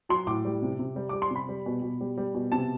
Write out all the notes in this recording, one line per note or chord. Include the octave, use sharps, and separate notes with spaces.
F#3 C6
A2 D6
G3
C3
C3
G3
G3 D6
C6
C3
B5
G3
B2
B2
G3
G3
B2
C3 A5